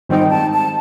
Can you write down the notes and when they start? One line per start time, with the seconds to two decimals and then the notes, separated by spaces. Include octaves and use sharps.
0.09 G#2 D#3 G3 C4 D#4 G5
0.30 A5
0.52 A5